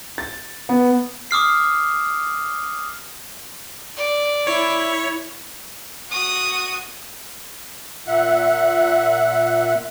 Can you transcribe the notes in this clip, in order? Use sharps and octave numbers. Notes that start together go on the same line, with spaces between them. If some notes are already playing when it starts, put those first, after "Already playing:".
A6
B3
D6 D#6 F6 C7
D5
E4 C#5
F#4 D#6
A#2 E5 F#5 F#6